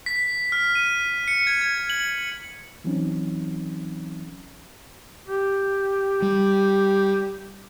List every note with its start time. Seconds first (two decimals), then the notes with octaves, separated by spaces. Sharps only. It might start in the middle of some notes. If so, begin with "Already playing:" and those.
0.06 B6
0.52 F6
0.75 D#7
1.28 C#7
1.47 G#6
1.61 G#6
1.90 F#7
2.84 E3 F#3 C4 C#4 D#4
5.27 G4
6.22 G3